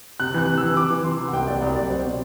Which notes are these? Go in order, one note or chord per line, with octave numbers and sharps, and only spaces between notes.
C3 F#6
E3 F#6
C3
E3 E6
E3 D6
E3
C3 C6
C3
F#5
C2 G5
F#3 D5
C2 D5
C2 D5
F#3 C5
B2